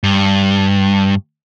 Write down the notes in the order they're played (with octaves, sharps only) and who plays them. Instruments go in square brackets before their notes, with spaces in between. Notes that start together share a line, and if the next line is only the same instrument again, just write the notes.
[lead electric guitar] G2